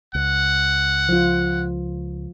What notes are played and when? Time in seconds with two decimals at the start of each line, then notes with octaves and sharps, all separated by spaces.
0.15 C#2 F#5
1.09 F3 F4